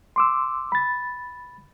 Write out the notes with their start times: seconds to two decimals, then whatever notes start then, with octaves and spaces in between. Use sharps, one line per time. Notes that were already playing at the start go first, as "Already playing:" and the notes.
0.16 C6 D6 E6
0.72 B5 A6